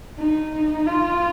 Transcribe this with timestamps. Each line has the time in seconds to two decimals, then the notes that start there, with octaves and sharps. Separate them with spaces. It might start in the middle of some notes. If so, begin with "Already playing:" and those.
0.19 D#4
0.86 F4